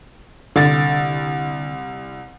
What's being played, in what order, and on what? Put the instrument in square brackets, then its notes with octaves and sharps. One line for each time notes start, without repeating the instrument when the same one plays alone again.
[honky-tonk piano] C2 A6 [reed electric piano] D3